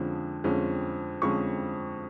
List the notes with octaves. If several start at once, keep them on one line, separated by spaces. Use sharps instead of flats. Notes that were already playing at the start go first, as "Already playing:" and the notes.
Already playing: F2 D3 F3 G#3 C#4
F2 D3 F3 G#3 C#4
F2 D3 F3 G#3 C#4 C#6